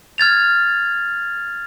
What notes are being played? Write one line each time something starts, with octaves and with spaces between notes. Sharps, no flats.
F6 G#6 A6 F7